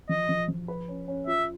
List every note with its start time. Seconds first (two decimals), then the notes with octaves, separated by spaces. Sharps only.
0.09 F3 D#5
0.29 F3
0.49 F3
0.68 B4
0.88 C#4
1.08 C#4
1.27 F4 E5